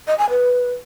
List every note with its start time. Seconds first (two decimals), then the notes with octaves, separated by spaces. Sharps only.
0.07 D#5
0.18 G#5
0.29 B4